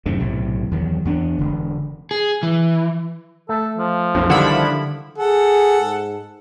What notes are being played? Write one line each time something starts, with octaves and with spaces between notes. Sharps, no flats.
F#2 A2 C3 D#3
B1 A2 C3
E2 D#3 F3 F#3
E2 B3 D4
E1 D3
G#4
E3
A3 A4
F3
B1 F2
D3 D#3 G3 D4 E4 F#5 B5
G#4 A4 F#5
G#2